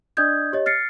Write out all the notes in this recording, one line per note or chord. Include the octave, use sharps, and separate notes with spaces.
D4 D5 D#5 D#6 G6 G#6
G4 C#5 D#5
F6 A6 C7 C#7